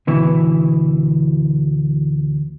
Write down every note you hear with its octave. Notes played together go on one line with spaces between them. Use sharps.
D2 B2 E3